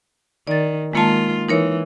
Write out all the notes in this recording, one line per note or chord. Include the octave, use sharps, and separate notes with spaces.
D#3 D5 A6
D#3 G#3 A#3 F4 A5
E3 D#4 A#4 C#5